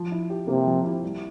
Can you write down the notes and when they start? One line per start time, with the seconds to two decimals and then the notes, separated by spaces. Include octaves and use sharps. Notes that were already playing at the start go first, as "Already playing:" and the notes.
Already playing: F3
0.12 E4
0.30 G4
0.47 C3 A#3
0.67 F3
0.84 E4
1.03 G3